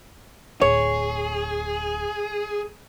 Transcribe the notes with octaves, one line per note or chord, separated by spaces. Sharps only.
D1 G#4 C#5